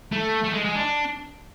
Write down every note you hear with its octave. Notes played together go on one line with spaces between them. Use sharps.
A3
A3
G#3
G#3
D4